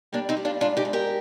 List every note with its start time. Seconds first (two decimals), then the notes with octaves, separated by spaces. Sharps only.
0.13 G3 A#3 D4
0.29 C4 D#4
0.37 G3
0.45 D4 F4
0.61 G#2 D4 F4
0.77 D#4 G4
0.85 G#2
0.93 G4 A#4